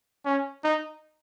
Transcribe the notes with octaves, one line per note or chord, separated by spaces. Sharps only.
C#4
D#4